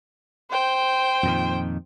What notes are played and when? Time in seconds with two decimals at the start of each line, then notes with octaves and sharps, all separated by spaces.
0.51 C5 G5
1.23 F2 A#2 D#3